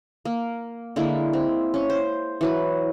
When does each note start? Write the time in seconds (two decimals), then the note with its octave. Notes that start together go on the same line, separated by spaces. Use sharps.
0.25 A#3
0.96 D3 G#3 A#3 E4
1.33 C4
1.74 C#4
1.90 C5
2.41 E3 F#3 B4